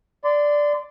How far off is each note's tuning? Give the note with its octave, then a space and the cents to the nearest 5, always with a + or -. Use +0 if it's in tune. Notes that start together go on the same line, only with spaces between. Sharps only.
D5 +0 C6 -25